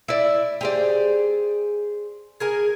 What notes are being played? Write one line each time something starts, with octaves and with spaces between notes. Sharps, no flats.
E4 D5
G4 G#4 C5 D5
G#4 A#4 G#5